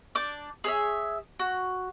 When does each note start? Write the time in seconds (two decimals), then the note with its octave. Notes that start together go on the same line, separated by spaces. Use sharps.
0.15 D4 D6 G6
0.64 G#4 C#5 E5
1.39 F#4